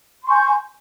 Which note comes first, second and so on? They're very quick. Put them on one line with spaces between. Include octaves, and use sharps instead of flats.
C6 C#6 G#5 G6